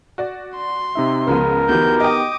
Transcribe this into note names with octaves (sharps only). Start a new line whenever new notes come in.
F#4 D5
C6
C3 D#4 E5
C#2 C#3 F3 B3 A#4
D2 E3 B3 D#4 G4 G6
D#5 G5 D6 D#6